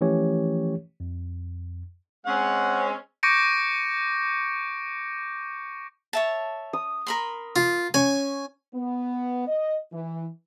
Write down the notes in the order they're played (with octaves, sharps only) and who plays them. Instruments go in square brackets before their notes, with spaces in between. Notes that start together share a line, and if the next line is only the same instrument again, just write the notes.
[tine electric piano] E3 F3 A3 C#4 G4 C#5
F2
[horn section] G#3 C4 C#4 [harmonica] F#5
[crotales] C#6 D6 G6 A#6 C#7 D7
[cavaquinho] C#5 E5 A5
[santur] D#6
[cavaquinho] A#4 B5 C6
[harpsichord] F4
[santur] C#4 [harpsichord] G#5 [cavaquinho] C#6
[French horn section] B3
D#5
E3